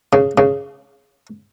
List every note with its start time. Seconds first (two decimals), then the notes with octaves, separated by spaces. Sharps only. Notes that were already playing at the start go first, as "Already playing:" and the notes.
0.13 C#3
0.38 C#3